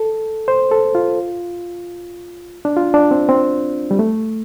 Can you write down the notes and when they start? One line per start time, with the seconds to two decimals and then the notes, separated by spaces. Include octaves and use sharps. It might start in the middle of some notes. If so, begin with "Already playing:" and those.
Already playing: A4
0.48 C5
0.71 A4
0.95 F4
2.65 D4
2.76 F4
2.94 D4
3.11 C4
3.29 C4
3.91 G3
3.99 A3